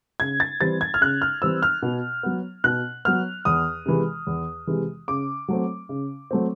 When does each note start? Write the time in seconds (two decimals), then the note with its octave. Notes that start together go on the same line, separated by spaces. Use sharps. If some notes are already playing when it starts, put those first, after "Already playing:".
0.20 C#3 G#6
0.40 A6
0.61 E3 G3 C4 A6
0.81 G#6
0.94 F6
1.01 C#3 F#6
1.22 F6
1.42 E3 G3 C4 E6
1.63 F6
1.82 B2
2.23 F#3 B3
2.64 B2 F#6
3.05 F#3 B3 F6
3.45 E2 D#6
3.86 C3 E3 G#3
4.27 E2
4.67 C3 E3 G#3
5.08 C#3 D6
5.48 F#3 A3 C4
5.89 C#3
6.31 F#3 A3 C4